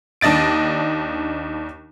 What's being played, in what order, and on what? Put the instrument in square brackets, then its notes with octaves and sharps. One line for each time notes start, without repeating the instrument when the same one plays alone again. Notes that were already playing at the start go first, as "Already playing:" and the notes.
[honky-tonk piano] D#2 D4 D#5 A6 D7